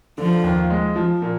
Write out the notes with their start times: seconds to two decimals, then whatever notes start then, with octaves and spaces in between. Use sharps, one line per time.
0.18 D3 F3
0.44 D#2
0.70 G#3
0.96 F3
1.22 A#2